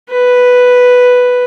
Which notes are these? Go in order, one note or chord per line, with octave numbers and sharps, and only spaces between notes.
B4